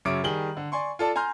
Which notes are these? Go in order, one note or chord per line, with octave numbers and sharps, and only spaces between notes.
F#2 C#3 C#5 E5 D6 D7
D#3 G3 G#4 F#7 G7
D3
D5 G#5 C6 C#6
F4 A4 D5 A5
G#5 A#5 C6 F6 G6